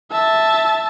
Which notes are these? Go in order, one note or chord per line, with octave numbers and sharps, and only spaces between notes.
E5 A5